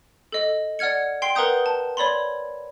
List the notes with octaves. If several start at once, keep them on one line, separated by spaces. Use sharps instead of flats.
A4 D#5
D5 F#5 F6 G#6 C#7
G5 C6 C7
A#4 B4 F#5 A#5 D#6 G6
A5
C#5 D5 B5 C6